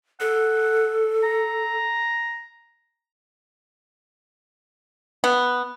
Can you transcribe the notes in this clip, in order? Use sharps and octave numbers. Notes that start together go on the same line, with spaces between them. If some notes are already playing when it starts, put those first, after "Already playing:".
A4 F#5
A#5
B3